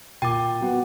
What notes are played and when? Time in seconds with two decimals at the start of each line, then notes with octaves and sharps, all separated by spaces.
0.22 A#2 G5 D6 A6 D#7
0.61 F#3 B3 F#5